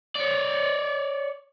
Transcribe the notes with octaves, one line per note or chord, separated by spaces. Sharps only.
C#5 D5